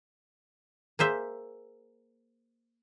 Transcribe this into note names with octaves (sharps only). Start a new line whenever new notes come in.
A#3 G#4 C5 E5